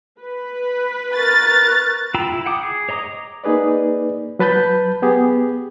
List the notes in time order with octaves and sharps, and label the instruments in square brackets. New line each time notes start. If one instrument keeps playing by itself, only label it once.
[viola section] B4
[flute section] A#4 C#6 F#6 [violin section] A6
[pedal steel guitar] F4 G5 A#5 B5 E6
E4
F#5 G5 D6 D#6
G#4
C#5 D#5 A#5 D6 D#6
[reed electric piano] A#3 D#4 G#4 B4 D5
F#3 B4 A5 B5 G6
B3 G4 G#4